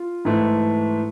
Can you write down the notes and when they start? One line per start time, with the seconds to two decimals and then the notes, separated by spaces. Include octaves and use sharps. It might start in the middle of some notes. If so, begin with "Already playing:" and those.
Already playing: F4
0.25 G#2 E3 A3